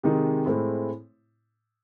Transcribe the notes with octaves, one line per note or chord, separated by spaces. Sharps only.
C3 D#3 G#3 D#4
A2 G#3 C4 E4